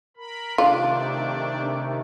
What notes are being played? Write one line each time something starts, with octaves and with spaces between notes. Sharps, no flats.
A#4 B5
C3 D#3 A3 D4 F4